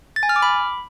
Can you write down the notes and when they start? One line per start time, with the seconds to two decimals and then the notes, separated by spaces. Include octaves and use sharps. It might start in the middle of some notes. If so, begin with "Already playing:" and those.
0.16 A6
0.23 G#5
0.29 F6
0.36 D6
0.42 B5